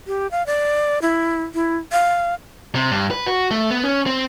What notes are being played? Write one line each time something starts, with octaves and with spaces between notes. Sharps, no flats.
G4
F5
D5
E4
E4
F5
C3
G2
B4
F#4
A3
B3
C#4
C4